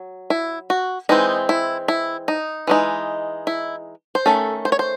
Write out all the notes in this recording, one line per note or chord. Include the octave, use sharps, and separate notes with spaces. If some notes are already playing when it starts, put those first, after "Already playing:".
Already playing: F#3
E4
F#4
E3 G#3 C4 D#4
E4
E4
D#4
E3 G#3 D#4
E4
C5
D#3 A3 C#4 A4
C5
C#5
C5